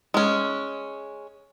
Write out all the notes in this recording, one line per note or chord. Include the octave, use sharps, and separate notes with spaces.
G#3 C#4